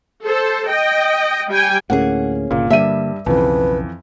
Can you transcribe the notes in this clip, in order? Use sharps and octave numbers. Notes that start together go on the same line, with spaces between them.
A4 C5
D#5 G5
G3 G5 G#5
D2 A2 A#3 C#4 G#4 F#5
G1 A#2 C#3
G2 D3 G3 A#3 E5 D#7
B1 F2 C#3 E3 B4